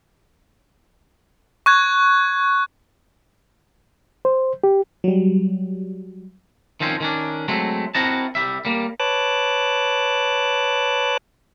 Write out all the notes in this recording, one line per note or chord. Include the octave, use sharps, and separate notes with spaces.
C#6 F#6 G#6
C5
G4
F#3 G3
D#3 F3 C4 C#4
D#3 C#4 D4
F#3 G#3 A3 C4
C4 E4 F#4 A#4 D#5 A5
C2 G3 E5
G3 A#3
B4 C#5 A5 D6 F#6